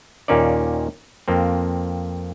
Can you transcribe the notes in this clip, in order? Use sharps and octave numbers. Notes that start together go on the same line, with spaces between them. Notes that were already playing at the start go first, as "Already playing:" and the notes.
D#2 A#2 A#3 C#4 D#4 D5
F2 A#3 C4